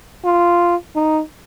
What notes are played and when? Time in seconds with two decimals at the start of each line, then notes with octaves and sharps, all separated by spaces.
0.25 F4
0.96 D#4